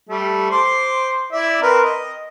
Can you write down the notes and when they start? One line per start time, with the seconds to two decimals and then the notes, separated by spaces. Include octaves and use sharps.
0.09 G3 A3
0.50 C5 C6 D6
1.32 E4 D5 E5
1.62 C4 A#4 B4
1.84 D#5